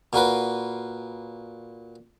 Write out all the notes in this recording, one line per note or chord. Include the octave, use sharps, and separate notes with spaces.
A#2 F#4 A#4 B4